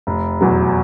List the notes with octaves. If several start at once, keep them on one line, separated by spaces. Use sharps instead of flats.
F1
E2 B2 F#3